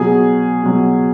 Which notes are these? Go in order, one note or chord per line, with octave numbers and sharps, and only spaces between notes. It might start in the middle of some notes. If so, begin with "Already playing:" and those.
Already playing: B2 F#3 G#4 G#5
B2 F#3